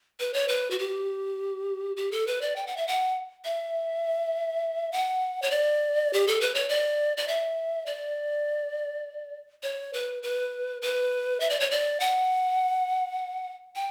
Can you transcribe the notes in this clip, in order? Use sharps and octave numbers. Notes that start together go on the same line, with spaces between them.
B4
C#5
B4
F#4
G4
G4
A4
B4
D5
G5
F#5
E5
F#5
E5
F#5
C#5
D5
G4
A4
B4
C#5
D5
D5
E5
D5
C#5
B4
B4
B4
E5
D5
C#5
D5
F#5
G5